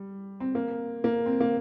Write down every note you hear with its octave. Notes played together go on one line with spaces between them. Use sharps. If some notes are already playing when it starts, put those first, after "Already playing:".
Already playing: G3
C4
A#3
A#3
C4
A#3